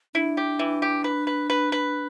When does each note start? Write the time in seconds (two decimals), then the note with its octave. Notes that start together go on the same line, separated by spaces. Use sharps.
0.14 D4 E4
0.37 G4
0.59 E3
0.82 G4
1.04 B4
1.27 B4
1.50 B4
1.72 B4